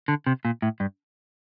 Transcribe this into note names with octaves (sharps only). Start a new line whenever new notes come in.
D3
C3
A#2
A2
G2